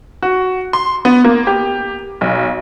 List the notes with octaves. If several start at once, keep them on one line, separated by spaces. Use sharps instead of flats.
F#4
C6
B3
A#3
G4
B1